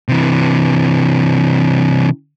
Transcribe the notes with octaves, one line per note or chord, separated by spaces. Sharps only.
C3 E3